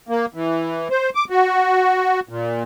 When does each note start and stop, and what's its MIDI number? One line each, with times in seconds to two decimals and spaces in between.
0.09 0.26 58
0.34 0.88 52
0.91 1.10 72
1.15 1.25 86
1.30 2.20 66
2.29 2.63 46